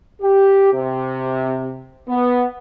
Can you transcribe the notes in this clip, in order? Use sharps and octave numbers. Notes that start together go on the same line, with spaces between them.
G4
C3
B3